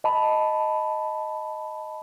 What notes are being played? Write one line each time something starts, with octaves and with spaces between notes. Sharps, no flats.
D#5 A5 B5